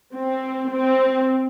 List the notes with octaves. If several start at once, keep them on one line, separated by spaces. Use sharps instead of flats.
C4
C4